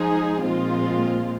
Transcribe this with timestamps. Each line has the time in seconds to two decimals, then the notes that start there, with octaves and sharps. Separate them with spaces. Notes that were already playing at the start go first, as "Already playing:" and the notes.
Already playing: F3 G#3 D#4 G#4
0.41 A#2 F3 G#3 C4 F4